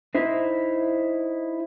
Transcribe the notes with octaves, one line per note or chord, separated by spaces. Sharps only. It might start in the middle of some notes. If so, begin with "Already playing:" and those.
D#4 E4 C5